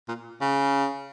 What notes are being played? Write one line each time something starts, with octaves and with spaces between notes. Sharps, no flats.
A#2
C#3